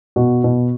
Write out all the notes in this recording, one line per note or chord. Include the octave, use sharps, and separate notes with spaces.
B2 F#4
B2